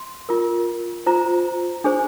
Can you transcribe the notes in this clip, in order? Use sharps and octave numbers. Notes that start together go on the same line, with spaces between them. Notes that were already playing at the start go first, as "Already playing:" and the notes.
Already playing: C6
F4 A#4
F4 C5 A#5
D4 G#4 C5